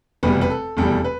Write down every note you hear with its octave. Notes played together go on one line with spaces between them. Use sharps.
F1 E2 B2 G3 B4
B4
A4
F1 E2 B2 G3 A4
B4